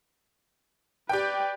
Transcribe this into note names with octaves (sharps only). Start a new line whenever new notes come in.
G4 B4 D5 G5